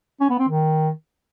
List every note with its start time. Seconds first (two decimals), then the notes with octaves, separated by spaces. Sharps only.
0.20 C#4
0.30 B3
0.39 C4
0.48 D#3